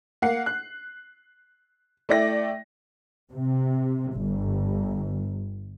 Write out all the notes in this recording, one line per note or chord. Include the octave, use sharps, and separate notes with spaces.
A#3 F#5 C7
F#6
A3 E4 D5 G5 A#6
C3
G1